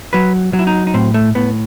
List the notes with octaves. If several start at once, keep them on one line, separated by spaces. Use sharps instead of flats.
F#3 B4
F#3
E4
D#4
D#4
A2 C4
A3
A2 B3